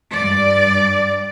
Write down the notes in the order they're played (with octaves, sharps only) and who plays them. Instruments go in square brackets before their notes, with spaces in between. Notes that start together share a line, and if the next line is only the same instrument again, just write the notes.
[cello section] G2 D5